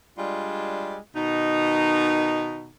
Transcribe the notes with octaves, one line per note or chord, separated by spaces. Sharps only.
G3 G#3 D4 F4
B2 D#3 D#4